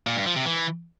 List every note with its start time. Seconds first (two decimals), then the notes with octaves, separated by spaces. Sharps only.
0.07 A#2
0.16 G2
0.26 F3
0.36 C3
0.46 E3